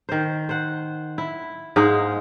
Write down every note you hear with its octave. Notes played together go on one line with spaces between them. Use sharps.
D#3 C5
C5 F#5
E4
G#2 G#3 A#3 D#4